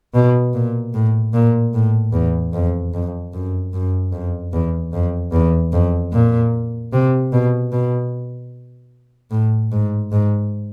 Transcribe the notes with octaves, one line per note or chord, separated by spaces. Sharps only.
B2
A#2
A2
A#2
A2
E2
F2
F2
F#2
F#2
F2
E2
F2
E2
F2
A#2
C3
B2
B2
A2
G#2
G#2